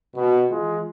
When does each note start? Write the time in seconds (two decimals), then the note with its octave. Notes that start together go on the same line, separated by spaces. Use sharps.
0.15 B2
0.49 E3 G#3 F4